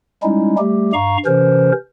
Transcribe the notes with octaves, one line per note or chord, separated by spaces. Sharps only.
G3 G#3 C#4 D#4 E4
G3 A3 G4
G2 F5 A#5 C#6
C3 E3 C#4 A#4 C5